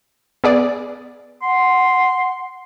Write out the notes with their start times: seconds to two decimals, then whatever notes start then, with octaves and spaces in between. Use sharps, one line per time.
0.44 B3 G#4 D5
1.42 F#5 C6